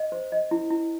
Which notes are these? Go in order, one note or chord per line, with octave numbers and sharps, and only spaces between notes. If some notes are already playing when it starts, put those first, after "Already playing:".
Already playing: D#5
C5
D#5
E4
E4